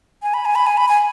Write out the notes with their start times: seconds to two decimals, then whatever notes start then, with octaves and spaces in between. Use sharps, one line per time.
0.23 G#5
0.34 B5
0.45 G#5
0.55 B5
0.66 G#5
0.77 B5
0.89 G#5